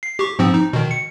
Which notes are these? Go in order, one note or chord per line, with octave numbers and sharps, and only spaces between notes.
C7
G4 C#6
G#2 F3 C4
D#4
B2 D#3
C#7